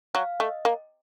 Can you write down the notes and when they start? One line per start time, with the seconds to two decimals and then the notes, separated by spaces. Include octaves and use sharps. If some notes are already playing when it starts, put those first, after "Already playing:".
0.15 F#3 F5
0.40 A3 D#5
0.65 A#3